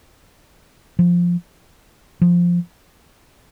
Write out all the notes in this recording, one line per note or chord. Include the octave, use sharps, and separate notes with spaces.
F3
F3